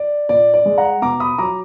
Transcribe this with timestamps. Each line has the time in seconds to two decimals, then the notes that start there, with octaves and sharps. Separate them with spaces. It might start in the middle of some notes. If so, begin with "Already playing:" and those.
Already playing: D5
0.29 A#2 D5
0.54 D5
0.66 G#3
0.78 F#5 A#5
1.02 B2 A#5 D6
1.20 B5 D#6
1.38 F#3 A#5 D6